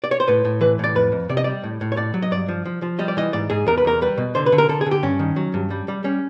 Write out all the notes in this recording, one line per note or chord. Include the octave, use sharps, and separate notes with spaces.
D5
C#5
C5
A2 B4
A2
E3 B4
A2 D5
F2 B4
F2
C3 D5
D#5
G3 D5
A2
A2
C#5
A2 D5
F#3
D#5
G2 D5
F3
F3
F3
G3 D#5
D5
E3 D#5
G#2 D5
G#2 G#4
E2 A#4
B4
E2 A#4
G3 B4
B2
D3 C5
B4
D3
A#4
D3 A4
G#4
D3
G4
G2 C#4
D#3
F#3
G2
G3
G3
G3 C#4